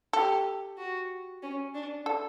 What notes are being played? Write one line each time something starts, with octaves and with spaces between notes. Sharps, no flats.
G4 A4
F#4
C#4
D4
A4